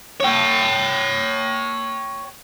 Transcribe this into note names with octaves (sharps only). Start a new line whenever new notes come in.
C#5 G5